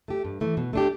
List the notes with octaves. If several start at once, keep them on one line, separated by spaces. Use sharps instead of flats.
A3 G4
G2
E3 A3
B2
A3 D4 G4